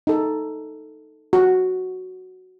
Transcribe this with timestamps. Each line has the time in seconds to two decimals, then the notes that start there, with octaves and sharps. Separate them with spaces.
0.07 D#4 A4
1.33 F#4